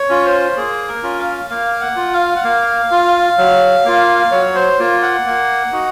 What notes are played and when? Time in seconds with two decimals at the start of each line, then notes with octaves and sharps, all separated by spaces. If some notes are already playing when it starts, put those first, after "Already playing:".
Already playing: C#5
0.09 C#4 F4
0.25 C5
0.57 A#3 G#4
0.88 A#4
1.03 C#4 F4
1.19 F5
1.50 A#3 F5
1.81 F#5
1.96 F4
2.13 F5
2.36 F#5
2.44 A#3 F5
2.91 F4
3.38 F#3
3.85 A#3 F4
4.31 F#3 C#5
4.55 C5
4.79 A#3 F4
5.02 F#5
5.25 A#3
5.72 D#4 F#4